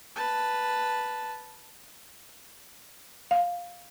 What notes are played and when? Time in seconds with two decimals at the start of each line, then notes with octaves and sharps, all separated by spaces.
0.16 B4 A5
3.31 F5